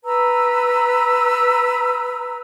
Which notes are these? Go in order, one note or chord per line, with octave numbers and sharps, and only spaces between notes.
B4 A#5 E6